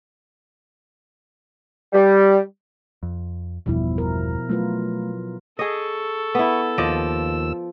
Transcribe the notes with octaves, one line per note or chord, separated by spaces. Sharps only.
G3
F2
G1 E2 B2 F3 G3 E4
A#4
F#3 A3 F4 B4
G#4 A4 D#5 C#6
B3 E4
D#2 F3 D5 D#5 E6